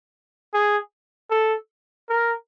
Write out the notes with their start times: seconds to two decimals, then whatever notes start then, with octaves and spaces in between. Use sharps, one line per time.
0.54 G#4
1.31 A4
2.09 A#4